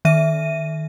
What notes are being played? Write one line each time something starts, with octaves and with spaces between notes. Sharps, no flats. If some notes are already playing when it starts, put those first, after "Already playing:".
D#3 E5 D#7